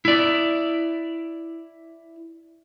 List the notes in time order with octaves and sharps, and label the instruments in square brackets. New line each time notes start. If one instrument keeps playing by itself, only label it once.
[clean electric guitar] E4 D5